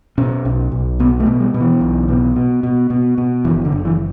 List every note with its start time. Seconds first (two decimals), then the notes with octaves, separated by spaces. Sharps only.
0.18 B2 C#4
0.45 B1
0.72 B1
0.99 B2 B3
1.20 A3
1.26 B2
1.40 G3
1.54 B2
1.60 E3
1.81 B1
2.09 B2
2.36 B2
2.63 B2
2.90 B2
3.18 B2
3.45 F#1 E3
3.65 D3
3.72 F#1
3.85 E3